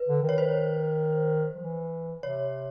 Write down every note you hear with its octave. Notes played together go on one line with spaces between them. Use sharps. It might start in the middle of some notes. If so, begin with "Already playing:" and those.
Already playing: B4
D3
D#3
C#5
C5
F3
E3
C3 C#5